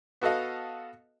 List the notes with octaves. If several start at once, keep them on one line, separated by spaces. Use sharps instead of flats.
B3 F#4 A4 D#5 F5